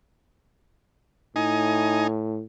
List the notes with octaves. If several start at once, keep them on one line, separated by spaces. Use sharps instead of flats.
A2 D#4 G#5